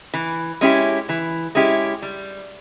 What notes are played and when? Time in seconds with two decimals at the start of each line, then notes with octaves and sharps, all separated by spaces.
0.14 E3
0.61 G#3 C#4 E4 G4
1.09 E3
1.55 G#3 C#4 E4 G4
2.02 G3